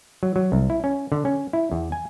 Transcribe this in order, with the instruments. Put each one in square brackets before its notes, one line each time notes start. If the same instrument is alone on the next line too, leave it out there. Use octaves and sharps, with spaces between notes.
[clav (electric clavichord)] F#3
F#3
C2
E4
C#4
D3
C#4
E4
E2
G#5